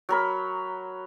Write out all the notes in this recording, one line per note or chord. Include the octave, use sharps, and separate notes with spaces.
F#3 A#4 B5